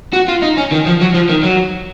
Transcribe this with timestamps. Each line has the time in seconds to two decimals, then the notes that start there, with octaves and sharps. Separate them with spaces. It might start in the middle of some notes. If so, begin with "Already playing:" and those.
0.13 F#4
0.28 F4
0.42 D#4
0.57 C#4
0.71 D#3
0.86 F3
1.01 F#3
1.14 F3
1.29 D#3
1.43 F#3